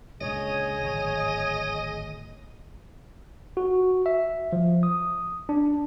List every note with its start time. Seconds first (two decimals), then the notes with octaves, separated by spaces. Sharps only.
0.21 C#2 A#2 D3 G#4 C#5 D#5
0.83 D1 G#1
3.57 F#4
4.06 E5
4.52 F3
4.83 D#6
5.49 D4